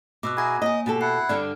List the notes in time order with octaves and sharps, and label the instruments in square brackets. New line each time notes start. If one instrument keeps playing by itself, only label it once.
[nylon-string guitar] B2 [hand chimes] D6 E6 F#6
[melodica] E4 G#4 G#5 [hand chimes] F#5 A#5 A#6
[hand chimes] A#3 C#5 G#5 [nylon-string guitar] D#5 [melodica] D#6
[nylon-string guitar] B2 G4 A4 [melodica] A5
[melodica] E4 F#5 [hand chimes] C7
[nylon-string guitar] G2 D3 D4 [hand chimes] D5 F6 G#6